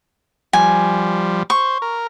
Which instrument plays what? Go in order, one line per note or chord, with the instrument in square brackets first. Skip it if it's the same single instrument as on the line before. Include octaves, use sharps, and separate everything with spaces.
[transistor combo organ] F3 G3 [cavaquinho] G#5
[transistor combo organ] C5 [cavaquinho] C#6
[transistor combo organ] A#4